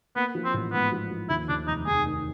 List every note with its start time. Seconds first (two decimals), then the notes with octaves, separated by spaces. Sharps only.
0.16 A#3 B3
0.35 F3
0.45 C4
0.54 A1
0.72 G#2 B3
0.92 F3
1.10 F3
1.29 D#2 E4
1.49 D#2 D4
1.67 F1 D#4
1.87 F1 G#4
2.05 D#3